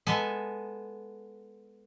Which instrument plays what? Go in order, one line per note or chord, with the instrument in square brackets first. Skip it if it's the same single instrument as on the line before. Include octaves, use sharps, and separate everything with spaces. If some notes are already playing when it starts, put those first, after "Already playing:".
[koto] G#3 B3 A4 E5 G#5 A5